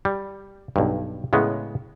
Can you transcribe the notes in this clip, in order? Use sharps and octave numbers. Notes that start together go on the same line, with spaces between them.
G3
B1 G2
A2 C#3 G#3 B3